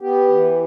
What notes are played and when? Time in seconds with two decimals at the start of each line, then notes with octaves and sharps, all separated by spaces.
0.01 B3 G4
0.28 E3